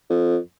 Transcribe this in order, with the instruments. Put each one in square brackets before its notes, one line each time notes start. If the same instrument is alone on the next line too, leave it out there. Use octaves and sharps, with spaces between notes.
[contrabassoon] F2